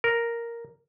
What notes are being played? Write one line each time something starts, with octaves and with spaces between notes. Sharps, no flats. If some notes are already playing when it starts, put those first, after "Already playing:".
A#4